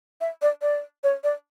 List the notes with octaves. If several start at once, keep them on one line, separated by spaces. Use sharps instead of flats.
E5
D5
D5
C#5
D5